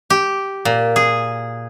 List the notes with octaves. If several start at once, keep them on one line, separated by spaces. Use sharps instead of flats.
G4
A#2
G#4